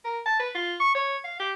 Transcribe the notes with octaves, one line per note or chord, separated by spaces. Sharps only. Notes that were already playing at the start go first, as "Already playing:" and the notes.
A#4
A5
B4
F4
C#6
C#5
F5
G4